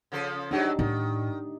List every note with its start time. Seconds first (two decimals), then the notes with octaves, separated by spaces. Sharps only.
0.12 C#3 F3 A4
0.51 G#2 F#3 D4 D#4 G4
0.79 A2 D#3